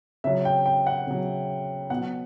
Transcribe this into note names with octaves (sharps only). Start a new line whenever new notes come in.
C#3 F#3 E5
G5
G5
F#5
C#3 F#3
B2 F#3 F#5